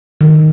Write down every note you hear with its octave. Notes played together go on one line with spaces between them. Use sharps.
D#3